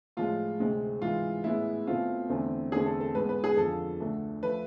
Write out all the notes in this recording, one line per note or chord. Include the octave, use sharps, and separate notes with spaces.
A2 F3 G#3 F4
D2 C3 G#3 C4
G#2 E3 G#3 F4
A2 G#3 B3 E4
B2 A3 C4 F4
E2 D3 A3 C4
E2 D3 A3 C4 G#4
A4
A4
G#2 G#3 B3 B4
B4
G#4
F2 D3 F3 A4
D2 D3 A3
F3 A3 B4